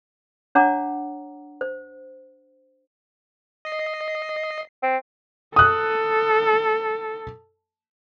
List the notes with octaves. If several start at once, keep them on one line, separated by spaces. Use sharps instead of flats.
D4 C#5 F#5 A#5 D6
C5
D#5 C7
C4
A4 D#6 F#6